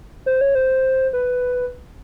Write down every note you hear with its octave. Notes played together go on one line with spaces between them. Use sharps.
C5
C#5
C5
B4